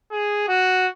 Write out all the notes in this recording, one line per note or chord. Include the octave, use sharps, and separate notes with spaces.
G#4
F#4